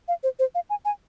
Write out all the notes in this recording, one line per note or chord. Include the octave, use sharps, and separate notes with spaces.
F5
C5
C5
F5
G#5
G#5